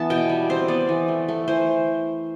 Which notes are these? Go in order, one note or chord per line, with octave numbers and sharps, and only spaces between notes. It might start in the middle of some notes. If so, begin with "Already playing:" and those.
Already playing: E3 B3 A5
B2 G5
G3
C4 C5
B3 D5
E3
A3
A3
E3 C5